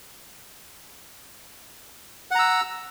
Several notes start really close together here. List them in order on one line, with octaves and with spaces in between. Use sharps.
F#5 A#5 E6